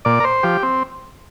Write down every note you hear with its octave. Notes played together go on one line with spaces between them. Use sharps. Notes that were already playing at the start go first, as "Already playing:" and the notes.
A#2 D5
A#4
C5
F3 G4
C4